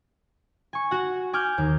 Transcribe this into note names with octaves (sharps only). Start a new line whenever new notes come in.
G#5 C#6
F#4 F#5
G#5 D6 F6 G6
D#2